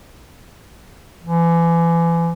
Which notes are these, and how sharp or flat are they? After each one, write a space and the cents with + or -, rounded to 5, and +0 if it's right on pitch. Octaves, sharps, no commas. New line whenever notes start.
E3 +35